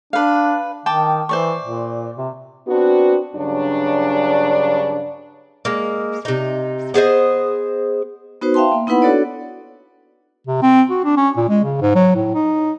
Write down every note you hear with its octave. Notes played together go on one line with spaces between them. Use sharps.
D4 B4 F5
D#3 G5 A5 D6
E3 C5 D5 C#6
A#2
C3
B3 C4 D4 F#4
G2 C#3 F#3 D4
G#3 A#3
C3 D#4
B3 G#4 C5 D#5
B3 D#4 F#4 B4 C5
E5 F5 G5 A5 C6
A#3
B3 D#4 E4 B4 F#5 B5
D4 F#4 A4 C#5 D5
C3
C4
F#4
D4
C#4
A#2
G#3
C#3
G#2
F#3
A2
D#4